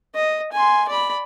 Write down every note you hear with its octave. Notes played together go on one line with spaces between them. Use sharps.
D#5
G#5 C6
D5 B5